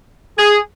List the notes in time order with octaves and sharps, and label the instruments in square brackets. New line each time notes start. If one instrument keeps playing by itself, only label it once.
[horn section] G#4